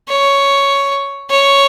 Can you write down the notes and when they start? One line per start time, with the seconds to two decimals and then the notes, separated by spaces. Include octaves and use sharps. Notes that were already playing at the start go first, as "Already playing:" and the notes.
0.09 C#5
1.30 C#5